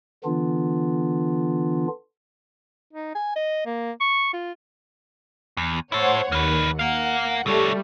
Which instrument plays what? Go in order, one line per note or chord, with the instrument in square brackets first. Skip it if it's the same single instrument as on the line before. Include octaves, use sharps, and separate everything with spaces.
[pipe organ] D3 E3 B3 D4 F4
[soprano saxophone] D#4
G#5
D#5
A#3
C#6
F4
[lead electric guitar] E2
[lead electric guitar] E4 A4 [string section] C5 C#5 F#5
[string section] D#2 [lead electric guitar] A#3 B4
[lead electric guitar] A#4 F5 [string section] F#5
[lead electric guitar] D3 C#5 [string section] G3 A3